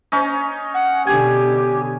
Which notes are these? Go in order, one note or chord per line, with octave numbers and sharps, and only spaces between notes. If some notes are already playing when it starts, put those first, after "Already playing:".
C#4 D#4
F#5
B2 D3 G4 G#5